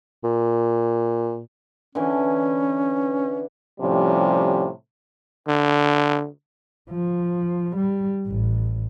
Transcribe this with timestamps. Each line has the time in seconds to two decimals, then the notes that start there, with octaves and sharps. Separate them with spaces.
0.24 A#2
1.95 D3 E3 C#4
3.80 A2 C3 F3 G3 C#4
5.48 D3
6.91 F3
7.77 G3
8.28 A1